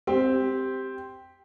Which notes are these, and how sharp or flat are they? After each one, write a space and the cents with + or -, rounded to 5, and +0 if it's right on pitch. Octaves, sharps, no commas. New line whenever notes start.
C4 +0 G4 +0